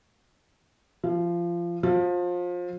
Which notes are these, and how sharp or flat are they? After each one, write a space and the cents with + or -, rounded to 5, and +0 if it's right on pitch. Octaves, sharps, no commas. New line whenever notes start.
F3 -20
F3 +25